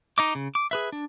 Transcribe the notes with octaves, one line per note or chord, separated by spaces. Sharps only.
D#4 D#5 D6
C#3
D6
G#4 B4 E5
D4